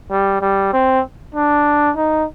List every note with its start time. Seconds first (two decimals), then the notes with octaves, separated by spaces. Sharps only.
0.11 G3
0.41 G3
0.73 C4
1.35 D4
1.97 D#4